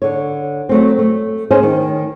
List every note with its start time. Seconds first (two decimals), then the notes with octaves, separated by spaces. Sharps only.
0.02 D3 C#5
0.69 F#3 A3 C4
0.99 A3
1.51 C#4 G#4 C5 D#5
1.63 D#3